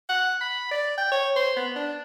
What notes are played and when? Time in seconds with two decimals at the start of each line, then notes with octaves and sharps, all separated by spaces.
0.09 F#5
0.41 B5
0.71 D5
0.98 G5
1.12 C#5
1.36 C5
1.57 B3
1.76 D4